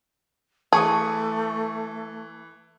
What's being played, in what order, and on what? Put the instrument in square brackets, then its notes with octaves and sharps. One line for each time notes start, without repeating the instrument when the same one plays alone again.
[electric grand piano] E3 C#6 D#6 [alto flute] A3 [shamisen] G#4 [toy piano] A5